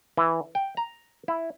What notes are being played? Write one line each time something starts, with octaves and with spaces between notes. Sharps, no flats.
E3
G5
A#5
E4